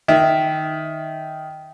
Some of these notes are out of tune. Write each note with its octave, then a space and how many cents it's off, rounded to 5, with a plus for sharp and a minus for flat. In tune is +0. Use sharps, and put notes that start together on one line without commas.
D#3 +0 E5 +0